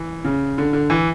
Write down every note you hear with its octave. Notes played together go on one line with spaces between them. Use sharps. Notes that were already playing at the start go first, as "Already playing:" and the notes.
Already playing: E3
C#3
D3
D3
E3